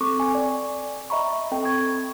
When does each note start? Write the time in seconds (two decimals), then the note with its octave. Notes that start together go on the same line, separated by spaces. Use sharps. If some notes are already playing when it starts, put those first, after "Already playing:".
0.01 C4 A4 C#6 D6
0.20 G#5
0.35 D5 G5
1.10 D#5 E5 A#5 B5 C#6
1.51 C4 A4 G5
1.64 C#6 G#6